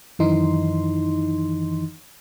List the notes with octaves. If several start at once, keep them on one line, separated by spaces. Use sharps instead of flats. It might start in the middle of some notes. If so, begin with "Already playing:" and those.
F#2 D#3 E3 D#4 C6